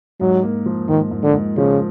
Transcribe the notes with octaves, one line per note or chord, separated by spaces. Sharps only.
G#2 F#3
A#3
F3
G#2 D#3
G#2
D3
G#2
C#3 F3